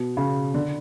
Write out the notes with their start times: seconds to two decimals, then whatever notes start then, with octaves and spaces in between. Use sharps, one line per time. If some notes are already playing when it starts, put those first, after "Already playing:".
Already playing: B2
0.17 C#3
0.54 D3